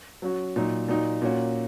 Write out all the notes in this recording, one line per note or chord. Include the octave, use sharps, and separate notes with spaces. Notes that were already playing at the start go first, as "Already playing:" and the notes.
F#3 C#4 F#4
A#2 F#3 D#4
A#2 F#3 D#4
A#2 A#3 C#4 F#4